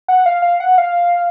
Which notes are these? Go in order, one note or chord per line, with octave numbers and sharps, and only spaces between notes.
F#5
F5
F5
F#5
F5